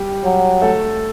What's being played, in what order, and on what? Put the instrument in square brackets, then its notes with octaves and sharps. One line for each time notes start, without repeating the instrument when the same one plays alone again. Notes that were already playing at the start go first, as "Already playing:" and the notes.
Already playing: [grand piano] G3 G4
[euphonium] F#3
[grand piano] A3 A4